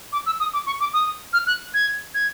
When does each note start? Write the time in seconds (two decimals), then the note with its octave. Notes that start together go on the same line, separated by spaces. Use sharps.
0.13 D6
0.26 E6
0.40 D#6
0.53 D6
0.66 C#6
0.80 D6
0.93 D#6
1.33 F6
1.47 F#6
1.74 G#6
2.15 G#6